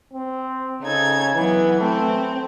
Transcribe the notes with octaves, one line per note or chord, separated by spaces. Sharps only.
C4
C#3 D#4 A4 G#6
E3 F#3 B3
A3 C4